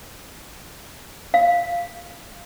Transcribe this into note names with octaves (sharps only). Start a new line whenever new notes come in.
F5